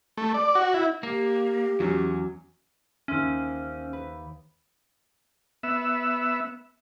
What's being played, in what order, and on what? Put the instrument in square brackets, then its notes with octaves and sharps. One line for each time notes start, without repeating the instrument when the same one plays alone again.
[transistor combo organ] A3
D5
F#4
E4
[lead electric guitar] A#3 [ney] G4
[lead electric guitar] E2 [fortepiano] F#3 C#4
[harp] D#2 C5 E5 [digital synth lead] C#4
[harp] B4
[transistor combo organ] B3 E5